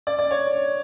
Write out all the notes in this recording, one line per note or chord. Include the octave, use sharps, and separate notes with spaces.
D5
D5
C#5